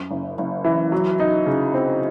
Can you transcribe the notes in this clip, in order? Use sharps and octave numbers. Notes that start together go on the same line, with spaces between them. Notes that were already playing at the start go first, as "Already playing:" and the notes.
Already playing: F#2
F#1
F#1
E3
F#3
D#4
C#3
C4